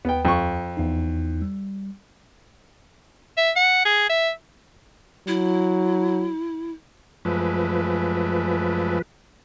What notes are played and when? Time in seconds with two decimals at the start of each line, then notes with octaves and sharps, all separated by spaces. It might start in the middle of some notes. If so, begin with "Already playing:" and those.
0.05 D#2 B3 G5
0.25 F2 C#6
0.77 E2 D#4
1.42 G3
3.37 E5
3.56 F#5
3.85 G#4
4.10 E5
5.28 F#3 E4
7.25 F#2 F3 G#3 A3 B4